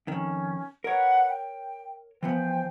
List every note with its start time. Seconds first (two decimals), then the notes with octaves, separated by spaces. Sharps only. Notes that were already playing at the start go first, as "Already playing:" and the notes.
0.07 F2 D#3 C#4
0.84 A#4 B4 C#5 F#5
1.29 G5
2.23 E3 F3 B3 C5 G5 G#5